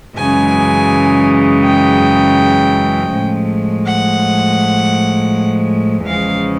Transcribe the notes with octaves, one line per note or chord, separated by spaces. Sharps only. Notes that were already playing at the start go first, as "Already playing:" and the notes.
F#2 C#3 E3 G#3 G#5
G5
A2 F3 G#3
F#5
E2 C#3 F3 G#3 F5